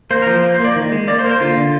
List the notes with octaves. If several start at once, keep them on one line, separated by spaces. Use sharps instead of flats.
A#3 C5
A#4
F3
C5
A#3
C5
A#3 D5
D#3
G#3
A#3 D5
C5
A#3 A#4
C5
D3 F4
D3